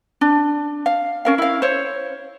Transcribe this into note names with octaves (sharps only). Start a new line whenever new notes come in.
D4
F5
C#4 A#4 F5
E4 F5
C5 C#5